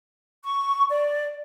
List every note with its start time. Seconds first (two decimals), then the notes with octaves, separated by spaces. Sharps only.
0.44 C#6
0.90 D5